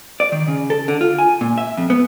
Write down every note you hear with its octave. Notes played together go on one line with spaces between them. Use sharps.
D5
D#3
C#3
A4
D3
F4
G#5
A#2
E5
F2
B3